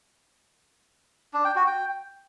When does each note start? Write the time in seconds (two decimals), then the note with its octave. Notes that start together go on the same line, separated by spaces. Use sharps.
1.34 D4
1.45 G5
1.56 F#4
1.67 G5